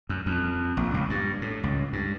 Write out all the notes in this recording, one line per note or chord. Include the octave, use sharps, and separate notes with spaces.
F#2
F2
A#1
C#2
G2
A2
C#2
G2